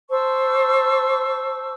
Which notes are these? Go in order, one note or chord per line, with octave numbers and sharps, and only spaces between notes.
C5 A5 C#6 E6